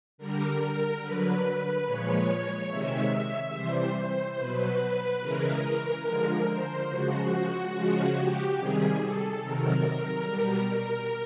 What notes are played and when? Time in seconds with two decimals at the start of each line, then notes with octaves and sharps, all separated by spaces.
0.18 D3 G3 A#4
0.60 A#4
1.01 D3 F#3 B4
1.85 A#2 F3 G#3 C#5
2.70 C3 D#3 G#3 E5
3.53 C3 E3 G3 C5
3.96 C5
4.37 B2 F#3 B4
4.80 B4
5.21 C#3 E3 G#3 A#4
5.63 A#4
6.05 D3 F3 G#3
6.48 C5
6.90 C#3 F3 G#3 F#4
7.74 C#3 F3 G#3
8.15 G4
8.57 C3 D#3 G3 G#4
8.99 A4
9.41 C3 D#3 F#3 A#4
10.25 B2 G3
10.68 A#4